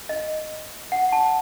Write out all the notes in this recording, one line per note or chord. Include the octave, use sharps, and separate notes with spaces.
D#5
F#5
A5